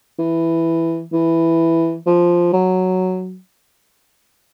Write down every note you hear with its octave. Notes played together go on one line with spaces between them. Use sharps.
E3
E3
F3
F#3